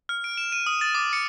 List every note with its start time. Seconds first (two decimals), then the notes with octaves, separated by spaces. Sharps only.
0.09 F6
0.24 D7
0.37 E7
0.52 D#7
0.66 D#6
0.81 A6
0.95 D6
1.13 C#7